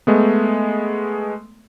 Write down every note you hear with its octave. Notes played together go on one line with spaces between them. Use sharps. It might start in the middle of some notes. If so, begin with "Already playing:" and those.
G#3 A3 B3